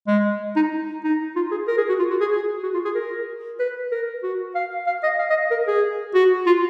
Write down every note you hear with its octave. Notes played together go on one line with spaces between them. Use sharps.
G#3
D#4
D#4
F4
G#4
A#4
G#4
F#4
F4
F#4
G#4
G#4
F#4
F4
G#4
A#4
B4
A#4
F#4
F5
F5
D#5
F5
D#5
A#4
G#4
F#4
F4